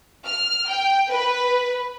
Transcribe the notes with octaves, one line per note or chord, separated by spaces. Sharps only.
F6
G5
B4